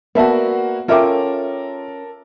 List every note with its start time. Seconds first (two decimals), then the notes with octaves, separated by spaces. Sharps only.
0.15 A#3 B3 F#4 D5 E5 F#5 A5
0.88 C#4 F4 A4 A#4 E5 G5 D6